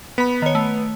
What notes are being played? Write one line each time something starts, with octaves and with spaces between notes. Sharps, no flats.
B3 B5 B6
D#3 C#5
A3